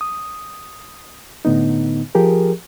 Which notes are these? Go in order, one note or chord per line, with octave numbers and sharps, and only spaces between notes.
D#6
A2 D3 B3 D#4
F3 G4 G#4 A#4